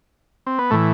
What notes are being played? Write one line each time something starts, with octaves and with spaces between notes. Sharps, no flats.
C4
B3
A2 E3 A3